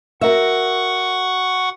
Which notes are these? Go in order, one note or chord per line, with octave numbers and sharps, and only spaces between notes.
F#4 A#4 E5 F#5 C#6